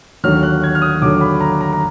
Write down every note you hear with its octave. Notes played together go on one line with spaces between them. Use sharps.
D#2 D3 F#3 F6
F#6
G#6
F6
D#6
D#2 D3 F#3 D6
B5
A#5
A#5
A#5